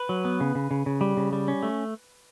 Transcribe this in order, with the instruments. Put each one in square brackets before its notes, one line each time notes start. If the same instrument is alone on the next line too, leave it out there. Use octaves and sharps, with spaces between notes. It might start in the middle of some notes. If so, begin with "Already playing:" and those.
Already playing: [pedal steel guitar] B4
F#3
B3
C#3
C#3
C#3
C#3
G3
C#3
G3
C#4
A3